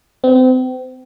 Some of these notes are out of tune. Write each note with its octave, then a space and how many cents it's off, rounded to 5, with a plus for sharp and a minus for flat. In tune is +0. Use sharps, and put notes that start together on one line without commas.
C4 -35